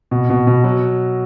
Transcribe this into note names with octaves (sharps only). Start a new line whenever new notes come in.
B2
B2
B2
F#3